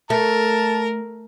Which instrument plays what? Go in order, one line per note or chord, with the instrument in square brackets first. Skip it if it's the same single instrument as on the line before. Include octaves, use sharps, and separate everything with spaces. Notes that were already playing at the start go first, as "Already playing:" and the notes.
[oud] A3 [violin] A#4 [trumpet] A5